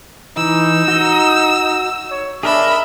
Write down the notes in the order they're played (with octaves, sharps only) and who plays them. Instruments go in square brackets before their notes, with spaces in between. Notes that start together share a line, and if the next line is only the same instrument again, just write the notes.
[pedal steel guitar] E3 [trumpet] D#4 [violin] E6
[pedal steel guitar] F#4 D#5
[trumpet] C#5
[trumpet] D4 [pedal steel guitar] G#4 A#4 D#5 [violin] E5 B5